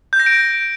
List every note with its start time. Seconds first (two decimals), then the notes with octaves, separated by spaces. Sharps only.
0.13 G6
0.20 A#6
0.26 D7